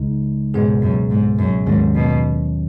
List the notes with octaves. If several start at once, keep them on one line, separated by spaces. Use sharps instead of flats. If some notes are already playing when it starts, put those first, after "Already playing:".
Already playing: C#2 C#3 G#3 D#4
C#2 G#2 B2 B3 G#4
F#2
G#2
F#2
D#2 G#2 D#3 F#3 C#4
B2